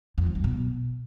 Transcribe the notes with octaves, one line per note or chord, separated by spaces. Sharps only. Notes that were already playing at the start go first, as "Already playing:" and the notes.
F2
D#3
F#3
B2